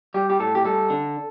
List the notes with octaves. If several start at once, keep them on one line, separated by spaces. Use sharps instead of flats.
G3 G4
G4
A2 A4
G4
G3 A4
D3